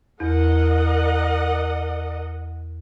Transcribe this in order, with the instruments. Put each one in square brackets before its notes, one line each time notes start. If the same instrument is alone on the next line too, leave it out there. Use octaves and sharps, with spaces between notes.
[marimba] E2 [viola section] A#4 D#5 F#5